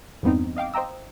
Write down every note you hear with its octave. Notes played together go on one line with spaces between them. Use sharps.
E2 G2 B3 C4 D#4
D#5 F5 G5 D6
C5 D#5 G5 A#5 E6